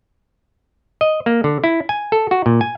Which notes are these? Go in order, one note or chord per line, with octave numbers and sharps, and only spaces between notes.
D#5
A#3
D3
E4
G#5
A4
F#4
A#2
G#5